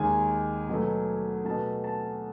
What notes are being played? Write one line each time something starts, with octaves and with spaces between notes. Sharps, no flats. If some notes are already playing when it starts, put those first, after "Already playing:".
Already playing: D#2 D#3 G#3 G#5
B2 F#3 A3
B2 A3 A5
A5